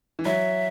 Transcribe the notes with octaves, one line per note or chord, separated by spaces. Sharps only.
E3
F#3 E5